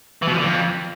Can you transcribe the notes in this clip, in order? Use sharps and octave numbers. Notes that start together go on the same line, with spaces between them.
E3
B2
F3
D3
F2